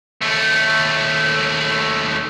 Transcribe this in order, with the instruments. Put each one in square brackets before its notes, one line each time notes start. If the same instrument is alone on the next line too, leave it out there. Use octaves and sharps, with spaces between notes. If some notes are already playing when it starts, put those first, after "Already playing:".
[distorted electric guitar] D#2 A3